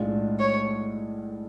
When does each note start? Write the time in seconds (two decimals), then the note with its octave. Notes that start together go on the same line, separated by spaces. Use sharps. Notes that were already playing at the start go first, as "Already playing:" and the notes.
Already playing: B1 A2 G#3 D4 F4
0.40 C#5